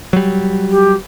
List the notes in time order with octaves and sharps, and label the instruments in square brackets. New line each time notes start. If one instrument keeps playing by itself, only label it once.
[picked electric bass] F#3 G3
[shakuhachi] G4